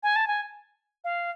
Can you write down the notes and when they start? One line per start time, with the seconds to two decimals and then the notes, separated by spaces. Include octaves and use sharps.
0.03 G#5
0.16 A5
0.28 G#5
1.04 F5